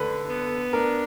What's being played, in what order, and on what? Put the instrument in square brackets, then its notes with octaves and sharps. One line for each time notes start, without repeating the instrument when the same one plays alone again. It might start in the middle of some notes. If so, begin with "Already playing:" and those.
Already playing: [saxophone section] D3 [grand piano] B4
[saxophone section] B3
[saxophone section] D4 [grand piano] A#4